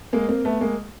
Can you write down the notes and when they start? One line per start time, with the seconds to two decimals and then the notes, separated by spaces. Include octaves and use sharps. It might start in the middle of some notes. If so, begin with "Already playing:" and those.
0.13 G#3 A#3
0.29 A#3 C4
0.45 A3 B3
0.61 G#3 A#3